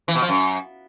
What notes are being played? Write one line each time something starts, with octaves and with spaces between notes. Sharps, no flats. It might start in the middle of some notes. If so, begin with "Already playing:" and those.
E3
B2
F3
F#2